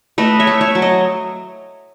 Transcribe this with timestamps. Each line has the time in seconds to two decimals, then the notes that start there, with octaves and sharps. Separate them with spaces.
0.18 A3 B4 D#5
0.40 C#5 E5
0.47 A3
0.61 C#5 E5
0.75 F#3
0.82 D#5